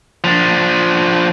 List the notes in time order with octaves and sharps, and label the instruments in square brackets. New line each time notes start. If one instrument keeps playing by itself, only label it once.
[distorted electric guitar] F3 D4